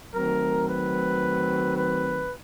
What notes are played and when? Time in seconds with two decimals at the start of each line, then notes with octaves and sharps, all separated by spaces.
0.14 D#3 F#3 A3 C4 A#4
0.68 B4
1.77 B4